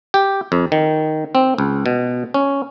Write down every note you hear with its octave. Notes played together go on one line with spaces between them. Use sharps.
G4
F2
D#3
C4
C#2
B2
C#4